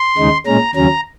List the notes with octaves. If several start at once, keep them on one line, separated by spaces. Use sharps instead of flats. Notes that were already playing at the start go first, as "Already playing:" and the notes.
Already playing: C6
D#2 C#3 G#3 D#4
A#2 G#3 C#4 A#5
D#2 C#3 F#3 C#4 A#5